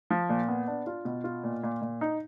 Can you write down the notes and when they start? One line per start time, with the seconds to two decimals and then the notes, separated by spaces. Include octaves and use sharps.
0.10 F3
0.29 A#2
0.48 B3
0.67 D4
0.87 F4
1.05 B2
1.24 F4
1.44 A#2
1.63 A#2
1.81 A#2
2.01 D#4